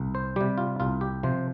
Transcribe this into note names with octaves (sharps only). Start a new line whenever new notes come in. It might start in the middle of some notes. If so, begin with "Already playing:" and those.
Already playing: C2
C5
C3 G3 G4
F4
C2 F4
G4
C3 F3 C5